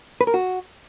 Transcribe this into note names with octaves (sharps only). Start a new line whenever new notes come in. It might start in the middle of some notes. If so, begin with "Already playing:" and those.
B4
A#4
F#4